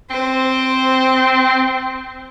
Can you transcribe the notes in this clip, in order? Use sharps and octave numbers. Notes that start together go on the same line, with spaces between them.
C4 C5